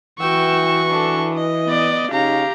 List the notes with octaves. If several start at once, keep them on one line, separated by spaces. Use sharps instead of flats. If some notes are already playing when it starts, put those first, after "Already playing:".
E3 F#4 G5 C#6 E6
D4 A4
D#5
B3 D5
C#3 C#4 D#4 G4 F5 A#5